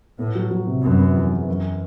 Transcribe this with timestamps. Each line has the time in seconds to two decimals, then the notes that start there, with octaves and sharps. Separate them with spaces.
0.19 A2 B3
0.35 F#3
0.51 F#3
0.67 C3
0.84 F#2 B3
0.99 B3
1.16 E2
1.33 E2
1.48 F#2